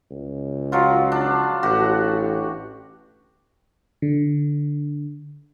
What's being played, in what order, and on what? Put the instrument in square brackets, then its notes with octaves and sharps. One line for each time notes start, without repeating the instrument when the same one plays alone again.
[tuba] C#2
[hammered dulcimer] F3 F#3 F4
D4
[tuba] A1 [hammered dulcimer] F#4 G4
[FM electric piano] D3